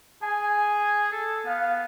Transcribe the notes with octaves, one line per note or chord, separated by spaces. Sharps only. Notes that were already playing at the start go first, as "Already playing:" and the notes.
G#4 G#5
A4
B3 F5